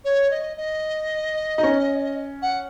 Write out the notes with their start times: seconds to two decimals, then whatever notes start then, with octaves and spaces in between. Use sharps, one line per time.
0.04 C#5
0.31 D#5
0.57 D#5
1.58 D#4
1.63 C#4
2.42 F#5